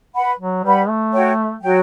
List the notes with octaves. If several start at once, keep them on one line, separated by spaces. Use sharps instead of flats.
B4 F#5 B5
F#3
G3 B4 F#5 B5
A3
F#4 C#5 G5
F#3 F#4 C#5 G5